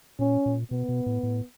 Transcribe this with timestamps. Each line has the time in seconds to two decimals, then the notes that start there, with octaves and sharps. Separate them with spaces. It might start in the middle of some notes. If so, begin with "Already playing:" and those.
0.19 A#2 C#4
0.46 A#2
0.71 B2 B3
0.89 B2
1.06 A2
1.23 A2